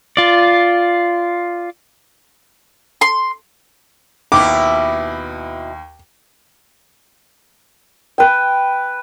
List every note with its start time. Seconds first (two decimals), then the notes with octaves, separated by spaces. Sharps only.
0.17 F4 D5
3.01 C6
4.32 D#2 B2 E4 D6
8.18 B4 G5